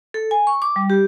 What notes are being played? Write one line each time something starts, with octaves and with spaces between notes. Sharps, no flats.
A4
G#5
C#6
D6
G3
G4